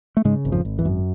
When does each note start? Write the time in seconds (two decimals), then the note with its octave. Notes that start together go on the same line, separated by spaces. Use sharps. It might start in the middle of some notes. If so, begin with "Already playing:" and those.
0.17 A3
0.25 G#2 C#3 G#3
0.45 G#1
0.52 F2 F3
0.65 G#1
0.79 E2 E3
0.85 F#2